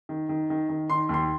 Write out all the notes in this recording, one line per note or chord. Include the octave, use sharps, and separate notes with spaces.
D#3
D#3
D#3
D#3
D#3 C6
D#2 C6